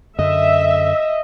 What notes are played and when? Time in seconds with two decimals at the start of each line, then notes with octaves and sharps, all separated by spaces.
0.19 F#2 D3 D#5 E5